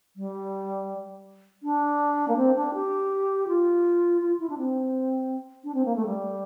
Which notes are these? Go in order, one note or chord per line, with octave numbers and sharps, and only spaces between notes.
G3
D4
A#3
C4
D4
G4
F4
F4
E4
D4
C4
D4
C4
A#3
A3
G3